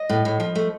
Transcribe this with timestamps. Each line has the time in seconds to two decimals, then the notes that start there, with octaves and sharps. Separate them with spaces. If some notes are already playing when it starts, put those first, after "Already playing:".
Already playing: D#5
0.10 A2
0.25 A2
0.40 F3
0.55 A3